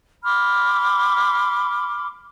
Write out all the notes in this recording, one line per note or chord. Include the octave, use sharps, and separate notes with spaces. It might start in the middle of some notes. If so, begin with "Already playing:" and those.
B5 C6 D6 F6